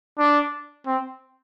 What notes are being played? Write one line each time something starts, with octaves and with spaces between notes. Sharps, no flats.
D4
C4